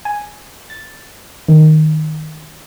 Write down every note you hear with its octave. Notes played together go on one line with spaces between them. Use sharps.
G#5
A6
D#3